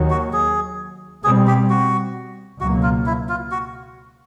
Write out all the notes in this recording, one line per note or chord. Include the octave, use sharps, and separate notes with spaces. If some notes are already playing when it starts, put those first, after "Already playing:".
Already playing: D#2 D#3 F#3
F#4
G#4
B2 G3 C4 G#4
G4
F#4
C#2 B2 F#3 A#3 F#4
F4
E4
F4
F#4